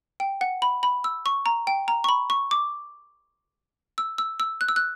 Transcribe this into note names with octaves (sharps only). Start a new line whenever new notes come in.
G5
F#5
B5
B5
E6
C#6
A#5
G5
A#5
C#6
B5
C#6
D6
E6
E6
E6
F#6
E6
F#6